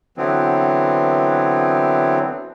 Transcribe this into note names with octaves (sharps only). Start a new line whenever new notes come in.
D3 E3 F#3 B3 C4